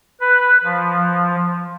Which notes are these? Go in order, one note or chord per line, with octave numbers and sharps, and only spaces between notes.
B4
F3